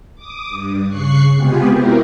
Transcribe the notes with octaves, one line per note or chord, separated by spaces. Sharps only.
D6 D#6
G2
C#3 C#6 F#6 C7
C3 G#3 B3 F4 G4 G#4
C4 E4 F#4 G4 A#4